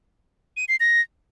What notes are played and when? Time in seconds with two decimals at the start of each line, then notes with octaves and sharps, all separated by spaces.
0.57 D#7
0.68 C7
0.80 A#6